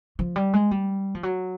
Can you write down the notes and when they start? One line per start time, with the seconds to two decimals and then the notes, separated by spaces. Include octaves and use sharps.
0.19 F3
0.36 G3
0.54 G#3
0.71 G3
1.15 F3
1.23 F#3